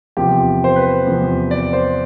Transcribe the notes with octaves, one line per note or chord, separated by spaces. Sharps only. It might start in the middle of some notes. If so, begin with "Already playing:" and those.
E2 C3 F3 G4
C5
B4
E2 C3 F3
D5
C5